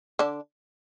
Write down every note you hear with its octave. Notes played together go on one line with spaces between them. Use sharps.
D3 D4